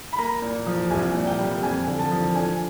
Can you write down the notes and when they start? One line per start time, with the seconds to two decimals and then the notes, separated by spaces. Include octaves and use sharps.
0.13 B5
0.18 A#3 A#5
0.42 A#2
0.66 F3
0.90 C2 G#5
1.15 A#2
1.27 G5
1.39 G3
1.63 F2 G#5
1.87 D3
1.99 A5
2.11 F3
2.35 D4 G#5